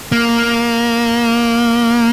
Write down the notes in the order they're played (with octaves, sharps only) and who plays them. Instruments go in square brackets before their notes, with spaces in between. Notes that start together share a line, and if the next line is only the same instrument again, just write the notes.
[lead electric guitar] A#3